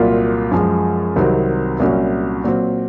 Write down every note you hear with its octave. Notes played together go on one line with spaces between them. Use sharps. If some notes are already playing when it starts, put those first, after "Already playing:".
Already playing: C2 A#2 F#3 A#3 F4
F#2 F3 G#3
C2 C3 D#3 F#3 C4
C2 A#2 F#3 C#4
A#2 F#3 C4